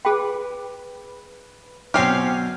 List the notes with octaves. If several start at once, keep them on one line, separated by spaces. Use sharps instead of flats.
G#4 B4 G5
B2 F#3 C4 C#4 G4 F6 C7